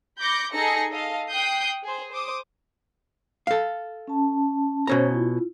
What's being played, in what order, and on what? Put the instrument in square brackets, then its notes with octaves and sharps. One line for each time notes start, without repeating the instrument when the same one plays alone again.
[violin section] B5 D6 G6 A#6 C#7
D#4 G#4 A4 A#6 C#7
A4 D#5 F5
G5 D#6 F#6 G6 C7
G#4 C5
C5 D6 D#6
[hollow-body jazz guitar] A4 F5
[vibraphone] C#4 A5
[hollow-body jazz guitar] B2 C#4 A#5 [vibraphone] C5 C#5 G#5
[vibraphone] E4 F4